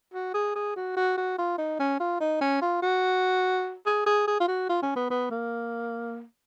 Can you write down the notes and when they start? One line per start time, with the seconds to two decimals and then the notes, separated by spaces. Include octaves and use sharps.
0.14 F#4
0.34 G#4
0.55 G#4
0.76 F#4
0.97 F#4
1.17 F#4
1.38 F4
1.58 D#4
1.80 C#4
2.00 F4
2.20 D#4
2.41 C#4
2.62 F4
2.82 F#4
3.86 G#4
4.06 G#4
4.28 G#4
4.40 F4
4.48 F#4
4.69 F4
4.82 C#4
4.96 B3
5.10 B3
5.31 A#3